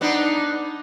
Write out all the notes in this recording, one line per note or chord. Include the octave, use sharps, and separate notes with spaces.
B3 D4 D#4